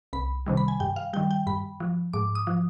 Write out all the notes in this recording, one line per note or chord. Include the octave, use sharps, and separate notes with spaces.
C2 B5
C3 D#3 G3
B5
G#5
G2 G5
F5
D#3 G3 G5
G5
G2 B5
F3
G#2 D6
D#6
F3